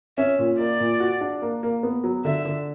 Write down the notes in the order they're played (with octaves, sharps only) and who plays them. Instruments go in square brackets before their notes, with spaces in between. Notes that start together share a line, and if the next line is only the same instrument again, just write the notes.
[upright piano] C#4 [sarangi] E5
[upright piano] A#2
[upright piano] A#3 [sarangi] D5
[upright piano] A#2
F#4
D4
A#3
A#3
B3
F#3
[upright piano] D3 [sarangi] E5
[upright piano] D3